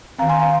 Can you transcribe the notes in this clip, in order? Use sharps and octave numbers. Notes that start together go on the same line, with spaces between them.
D#3 C4 F5 A#5
G#5 C6
F5 A#5